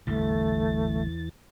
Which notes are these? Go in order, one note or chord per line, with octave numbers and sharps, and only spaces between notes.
A1 E2 D3 E3 G3 A3 A6